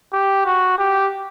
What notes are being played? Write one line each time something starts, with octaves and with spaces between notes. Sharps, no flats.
G4
F#4
G4